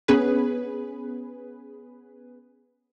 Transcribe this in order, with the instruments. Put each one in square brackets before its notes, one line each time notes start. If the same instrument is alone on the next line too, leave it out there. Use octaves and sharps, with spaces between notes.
[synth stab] B3 C#4 G#4 B4